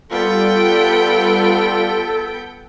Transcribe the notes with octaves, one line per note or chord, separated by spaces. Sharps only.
G3 B3 F4 A4 G5